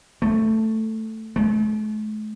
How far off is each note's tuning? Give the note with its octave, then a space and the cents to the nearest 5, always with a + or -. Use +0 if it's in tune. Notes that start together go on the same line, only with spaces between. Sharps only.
A3 +5
A3 -45